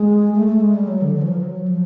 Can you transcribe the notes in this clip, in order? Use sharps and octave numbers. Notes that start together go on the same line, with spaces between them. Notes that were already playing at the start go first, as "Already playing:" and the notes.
Already playing: G#3
A3
A3
G#3
G3
F#3
D3
F#3
E3
F3
F#3
F3